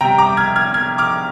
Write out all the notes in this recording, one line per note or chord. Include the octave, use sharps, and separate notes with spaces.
C3 G3 G5 A#5
A#5 D6
F6 G#6
F6 G#6
F6 G#6
D6 F6